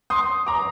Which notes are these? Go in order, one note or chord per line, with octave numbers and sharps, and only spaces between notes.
C6 D#6
A#5 D6